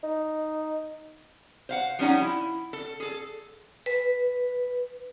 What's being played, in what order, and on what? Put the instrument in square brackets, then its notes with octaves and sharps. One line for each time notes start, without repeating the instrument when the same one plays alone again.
[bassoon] D#4
[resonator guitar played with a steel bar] C5 F5 F#5
F3 G3 C#4 D#4 F#5
E4
A4
G#4 A4
[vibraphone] B4